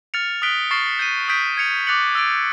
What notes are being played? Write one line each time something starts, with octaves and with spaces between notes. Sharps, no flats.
F6 A6 C#7 F7
D#6 F#6 B6 D7 G7
C#6 F6 A6 C7
G6 C7 D#7
D#6 G6 B6 D7
G#6 C#7 F7
D6 F#6 A6 C#7 F#7
E6 A6 D7